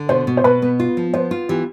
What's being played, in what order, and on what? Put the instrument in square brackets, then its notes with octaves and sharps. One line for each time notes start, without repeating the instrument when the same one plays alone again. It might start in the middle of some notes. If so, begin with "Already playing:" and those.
Already playing: [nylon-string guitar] D3
[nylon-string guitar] B2 [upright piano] C5
[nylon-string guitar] B2
[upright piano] C5
[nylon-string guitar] B2 [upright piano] B4
[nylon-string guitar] B3
F4
F3
[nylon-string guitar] B3 [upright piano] C5
[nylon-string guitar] F4
[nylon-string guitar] E3 [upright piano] G4